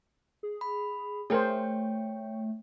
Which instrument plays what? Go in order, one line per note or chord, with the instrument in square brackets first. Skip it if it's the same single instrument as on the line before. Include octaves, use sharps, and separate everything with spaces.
[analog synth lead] G#4
[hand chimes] B5
[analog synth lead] A3 [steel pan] G#4 A#4 C5 [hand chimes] C#5 G5